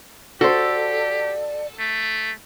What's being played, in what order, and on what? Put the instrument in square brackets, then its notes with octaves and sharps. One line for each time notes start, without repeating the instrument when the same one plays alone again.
[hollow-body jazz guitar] F#4 C5 [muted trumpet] G4 [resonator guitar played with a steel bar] A4 [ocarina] D5
[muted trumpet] A3